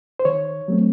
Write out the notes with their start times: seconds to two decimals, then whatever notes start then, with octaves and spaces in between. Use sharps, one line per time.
0.19 C5
0.25 D#3 C#5
0.68 F#3 A3 C4